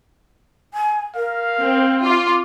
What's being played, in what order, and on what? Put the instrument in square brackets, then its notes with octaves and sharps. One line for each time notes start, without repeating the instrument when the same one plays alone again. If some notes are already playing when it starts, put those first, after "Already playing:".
[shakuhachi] G#5
[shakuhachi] A#4 [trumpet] F5
[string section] C4
[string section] F4 [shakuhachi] D6